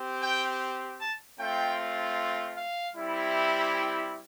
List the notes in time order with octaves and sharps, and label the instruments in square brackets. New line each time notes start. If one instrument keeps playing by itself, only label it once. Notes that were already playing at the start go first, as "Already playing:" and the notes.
Already playing: [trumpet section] C4 G4
G5
A5
A3 C4 F4 G5
F5
G3 C4 E4 G4
G5